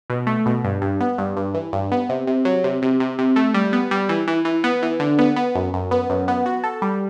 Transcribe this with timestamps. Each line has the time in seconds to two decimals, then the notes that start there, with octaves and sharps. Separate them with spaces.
0.10 B2
0.27 A3
0.46 B2
0.64 G2
0.82 G2
1.00 B3
1.18 G2
1.37 G2
1.54 E3
1.73 G2
1.92 B3
2.09 C3
2.27 C3
2.45 F#3
2.64 C3
2.82 C3
3.00 C3
3.19 C3
3.36 A3
3.54 G3
3.73 B3
3.91 G3
4.09 E3
4.28 E3
4.45 E3
4.64 B3
4.83 E3
5.00 D3
5.19 B3
5.36 B3
5.55 F#2
5.73 F#2
5.91 B3
6.10 F#2
6.28 B3
6.46 F#4
6.64 A4
6.82 G3